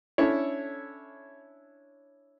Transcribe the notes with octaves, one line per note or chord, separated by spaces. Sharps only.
C#4 D4 E4 A4 C#5